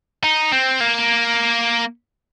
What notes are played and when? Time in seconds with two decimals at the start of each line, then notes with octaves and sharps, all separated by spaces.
0.23 D#4
0.52 C4
0.81 A#3